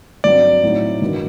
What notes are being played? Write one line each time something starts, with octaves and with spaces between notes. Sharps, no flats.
G2 F#3 C4 D5
A2 F#3 C4 D#4
G2 D#3 F#3